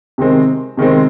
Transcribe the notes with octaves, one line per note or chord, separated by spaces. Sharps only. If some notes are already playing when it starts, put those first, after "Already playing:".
C3 D#3 G#3 C4
C3 D#3 G#3 C4